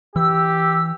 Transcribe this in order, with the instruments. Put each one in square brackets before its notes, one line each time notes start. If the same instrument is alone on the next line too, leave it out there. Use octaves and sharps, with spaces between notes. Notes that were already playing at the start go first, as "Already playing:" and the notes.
[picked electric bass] E3 [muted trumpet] G4 [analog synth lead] E6